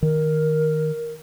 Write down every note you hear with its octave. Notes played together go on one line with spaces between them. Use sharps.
D#3 A#4